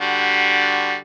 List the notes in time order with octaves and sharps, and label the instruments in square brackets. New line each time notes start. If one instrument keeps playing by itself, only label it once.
[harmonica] D3 G3 F#4